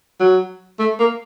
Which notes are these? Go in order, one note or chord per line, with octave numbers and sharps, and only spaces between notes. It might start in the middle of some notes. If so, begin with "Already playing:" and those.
F#3
A3
A#3